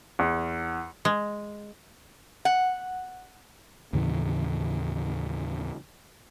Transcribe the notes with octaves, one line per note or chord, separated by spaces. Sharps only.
E2
G#3
F#5
D#2 A2 C#3 E3